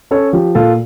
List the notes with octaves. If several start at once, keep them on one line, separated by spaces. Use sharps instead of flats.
C#4 A4 C#5
F3 G4
A#2 F4 A4